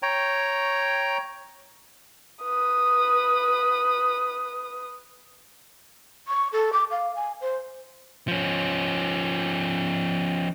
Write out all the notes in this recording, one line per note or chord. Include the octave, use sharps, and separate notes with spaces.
C#5 G5 A#5
B4 D#6
C#6
A4
D6
F5
G#5
C5
F3 C#4